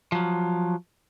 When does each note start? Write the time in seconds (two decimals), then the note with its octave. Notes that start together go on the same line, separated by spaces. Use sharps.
0.12 F3 F#3